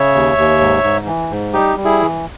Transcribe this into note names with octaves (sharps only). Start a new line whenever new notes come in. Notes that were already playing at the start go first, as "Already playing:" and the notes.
Already playing: C#3 C#5 E5
D#2
D#2
G#2
G#2
E3
G#2
G3 D#4 G4
G3
E4 G#4
E3